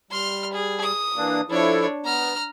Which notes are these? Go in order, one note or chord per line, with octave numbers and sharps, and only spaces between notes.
G3 C6 F6
G#4
D#6
E3 A#3 D4
F3 D4 E4 A4 C#5
B3 A#5 F6